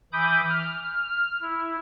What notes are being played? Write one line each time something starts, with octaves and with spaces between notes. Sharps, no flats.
E3 B5 D6 D#6 G6
F6
F6
E4